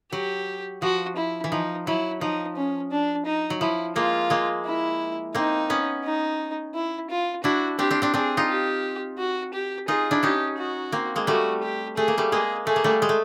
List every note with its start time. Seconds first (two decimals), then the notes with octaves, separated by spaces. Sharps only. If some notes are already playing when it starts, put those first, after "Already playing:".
0.12 F#3 G4
0.82 F3 F#4
1.16 E4
1.44 E3
1.51 F3 D#4
1.87 F#3 E4
2.21 F3 D#4
2.56 C#4
2.91 D4
3.26 D#4
3.50 F#3
3.61 F3 E4
3.96 G#3 A#3 F4
4.30 G#3 A#3
4.65 E4
5.35 A#3 C4 D#4
5.70 B3 C#4
6.04 D#4
6.74 E4
7.10 F4
7.44 D4 E4 F#4
7.79 C4 D4 G4
7.91 C4 D4
8.02 C4 D4
8.14 C4 D4 G#4
8.37 D#4 F4
8.49 G4
9.18 F#4
9.54 G4
9.88 D#4 F4 G#4
10.11 D4 E4
10.23 C#4 D#4 G4
10.58 F#4
10.92 A#3 C4
11.16 G#3 A#3
11.27 G3 A3 F#4
11.63 G4
11.97 A3 G#4
12.08 A#3
12.18 G3 A3
12.32 G#3 A#3 G#4
12.67 A3 G#4
12.76 A#3
12.84 G3 A3
13.02 G#3
13.09 A3